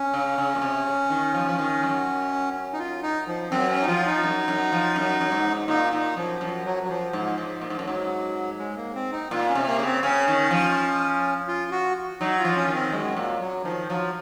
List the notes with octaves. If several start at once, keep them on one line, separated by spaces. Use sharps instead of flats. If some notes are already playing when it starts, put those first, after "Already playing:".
Already playing: C#4
C#3
C#3
A#2
C3
C#3
D#3
F3
F3
D#3
F#2
D#4
F4
D#4
F3
F#2 C4
C#4
D#4
F3 F4
D#4
F#2
F#2
F3
F#2
F#2
G#2
A#2 D#4
A#2 D#4
F#2 F3
F#2 F3
F#3
F#3
F3
G#2 F3
G#2
A#2
G#2
F#2
G#2 F#3
G#3
A#3
C4
D#4
A#2 F4
C#4
C3
A#3
C#3
C4
C#3 C#4
D#3
F3
F4
F#4
F#3 D#4
F4
F3
C#4
D#3
C4
F#2 G#3
A#2 F#3
F#3
D#3 F3
F3 F#3